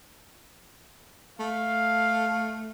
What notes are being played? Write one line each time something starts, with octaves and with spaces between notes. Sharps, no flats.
A3 F5